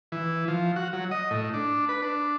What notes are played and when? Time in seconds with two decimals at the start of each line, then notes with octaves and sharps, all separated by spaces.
0.12 E3
0.48 F3
0.76 F#4
0.93 F#3
1.11 D#5
1.31 A2
1.54 D4
1.89 B4
2.02 D4